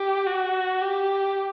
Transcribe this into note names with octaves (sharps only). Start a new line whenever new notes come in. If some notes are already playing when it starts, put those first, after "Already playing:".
Already playing: G4
F#4
G4